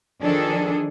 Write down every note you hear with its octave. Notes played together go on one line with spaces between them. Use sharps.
D#3 F3 D4 G#4 A4